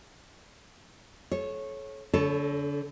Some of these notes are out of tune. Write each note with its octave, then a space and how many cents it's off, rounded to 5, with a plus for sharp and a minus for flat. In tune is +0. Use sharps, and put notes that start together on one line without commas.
A4 -35 C#5 -15
D3 -35 A4 +5 C#5 +0